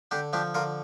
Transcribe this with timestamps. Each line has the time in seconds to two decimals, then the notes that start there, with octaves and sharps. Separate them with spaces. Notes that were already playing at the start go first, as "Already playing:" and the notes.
0.11 D3 D4 G4
0.33 F3 D4 G4
0.54 D3 F4 A#4